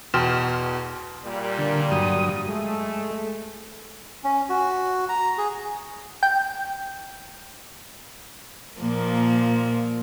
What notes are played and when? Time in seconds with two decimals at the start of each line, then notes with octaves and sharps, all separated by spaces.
0.14 E2 B2 G5 C6 F6 E7
1.24 A#2 G3
1.58 D3
1.91 G2 F#3 D#6
2.49 G#3 A3
4.24 C#4
4.49 F#4
5.09 A#5
5.38 G#4
6.23 G5
8.80 A#2 F3 A#3